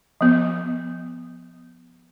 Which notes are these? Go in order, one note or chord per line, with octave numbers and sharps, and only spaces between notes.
F3 B3